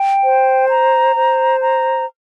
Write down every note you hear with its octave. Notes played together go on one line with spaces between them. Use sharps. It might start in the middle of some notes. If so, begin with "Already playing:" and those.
Already playing: G5
C5
A#5
C5
A#5